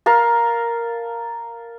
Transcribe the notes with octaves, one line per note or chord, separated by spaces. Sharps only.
A#4 F5 A5